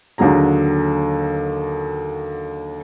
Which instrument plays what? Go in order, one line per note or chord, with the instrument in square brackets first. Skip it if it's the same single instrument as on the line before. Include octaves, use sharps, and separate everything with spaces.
[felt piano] D#2 D3 F#3 G#4 A#5